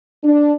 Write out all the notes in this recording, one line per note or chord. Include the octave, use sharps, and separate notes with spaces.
D4